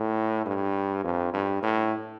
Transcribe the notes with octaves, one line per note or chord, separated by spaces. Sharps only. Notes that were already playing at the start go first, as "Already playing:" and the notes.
Already playing: A2
G2
F2
G2
A2